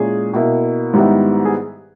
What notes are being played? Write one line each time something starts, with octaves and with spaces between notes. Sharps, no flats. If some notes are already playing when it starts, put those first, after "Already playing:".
Already playing: A#2 G#3 C#4 E4 G#4
B2 A#3 E4
G#2 D#3 G3 B3 E4
G#4